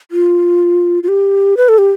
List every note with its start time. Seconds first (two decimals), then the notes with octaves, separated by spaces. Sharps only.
0.11 F4
1.03 F4
1.08 G4
1.57 B4
1.69 A4
1.78 G4